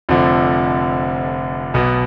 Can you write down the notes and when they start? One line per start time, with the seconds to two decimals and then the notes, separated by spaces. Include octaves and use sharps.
0.09 F1 F2 D3 F3
1.74 B1 B2 B3